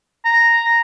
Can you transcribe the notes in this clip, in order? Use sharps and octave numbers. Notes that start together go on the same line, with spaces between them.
A#5